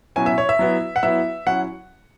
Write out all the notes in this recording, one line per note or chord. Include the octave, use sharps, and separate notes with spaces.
B2 F#3 C#4 E4 G#5
E5
C#5
E5
F#3 B3 E4
F#5
F#3 B3 E4 E5
F#3 C#4 E4 F#5